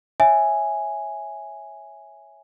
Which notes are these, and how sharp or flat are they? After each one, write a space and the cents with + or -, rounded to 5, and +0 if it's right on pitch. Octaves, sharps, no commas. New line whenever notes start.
C#5 +0 E5 +0 G#5 +0